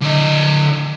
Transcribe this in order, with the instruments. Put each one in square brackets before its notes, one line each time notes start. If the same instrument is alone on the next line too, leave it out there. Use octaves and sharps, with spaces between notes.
[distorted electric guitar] D3 D#5